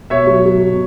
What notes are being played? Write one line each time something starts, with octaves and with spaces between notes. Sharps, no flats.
B2 C#5 E5
F#3
F#3
B2